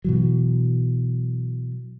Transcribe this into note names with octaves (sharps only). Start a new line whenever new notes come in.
B2 E3 F#3